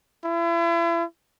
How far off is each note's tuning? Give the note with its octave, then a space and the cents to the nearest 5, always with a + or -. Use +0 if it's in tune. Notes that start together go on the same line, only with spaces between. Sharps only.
E4 +40